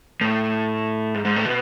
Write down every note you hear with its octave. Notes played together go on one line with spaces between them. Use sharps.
A2
G#2
G#2
A2
B2